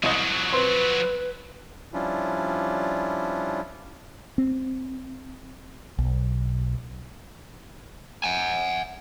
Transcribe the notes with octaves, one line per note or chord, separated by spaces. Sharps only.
C2 F3 F#3 D#5
C4 B4 C6
F3 G3 C#4 D4 E4 F4
C4
B1
F#5 G#5